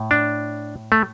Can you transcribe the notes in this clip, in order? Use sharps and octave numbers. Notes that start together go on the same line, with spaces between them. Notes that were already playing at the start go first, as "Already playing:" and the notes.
Already playing: A2
D4
A3